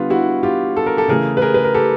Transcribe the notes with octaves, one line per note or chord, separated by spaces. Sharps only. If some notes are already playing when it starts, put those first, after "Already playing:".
Already playing: D3 G3 B3 F4
E4 F#4
F4 G4
A4
A#4
G4 A4
C#3 E3 A3 G#4 A#4
B4
G#4 A#4
B4
A#4
G4 A4